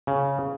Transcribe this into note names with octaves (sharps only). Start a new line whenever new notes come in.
C#3